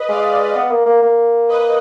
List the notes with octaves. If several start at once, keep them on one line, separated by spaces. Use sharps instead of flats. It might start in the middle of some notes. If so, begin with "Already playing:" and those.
Already playing: B4 D#5
G#3 D5 F5
B3
A#3
A#3
A#3
B4 D#5